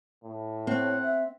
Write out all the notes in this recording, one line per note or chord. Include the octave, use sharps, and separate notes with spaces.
A2
C4 C#5 F#5
E5